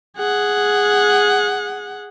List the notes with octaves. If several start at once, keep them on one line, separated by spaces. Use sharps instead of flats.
G#4 F#5